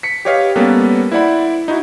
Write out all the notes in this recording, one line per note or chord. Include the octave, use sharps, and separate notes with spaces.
B6 C#7
G4 B4 C#5 D#5 F5
G3 A#3 B3 C#4 A4 B4
E4 C5 D5 F#5 B5
D#4 E4 F#4